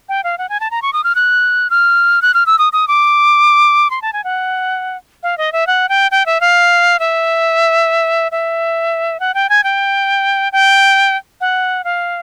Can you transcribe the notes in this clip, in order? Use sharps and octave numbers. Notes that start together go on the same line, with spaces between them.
G5
F5
F#5
G#5
A5
A#5
C#6
D#6
F6
F#6
F6
F#6
F6
E6
D#6
D#6
D6
C6
A5
G#5
F#5
F5
D#5
E5
F#5
G5
G5
E5
F5
E5
E5
F#5
G5
G#5
G5
G5
F#5
F5